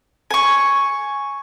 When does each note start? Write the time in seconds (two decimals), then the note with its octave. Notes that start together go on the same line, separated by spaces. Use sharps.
0.31 G#5 C#6